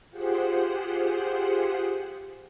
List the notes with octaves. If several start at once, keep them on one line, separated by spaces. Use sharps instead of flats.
F4 G4 G#4 C5 F#5